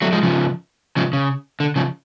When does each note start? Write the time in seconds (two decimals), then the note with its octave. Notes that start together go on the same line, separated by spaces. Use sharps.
0.02 F#3 A3
0.13 F3 G#3
0.23 C#3 F3
0.97 C#3 F3
1.13 C#3
1.60 D3
1.76 C#3 F3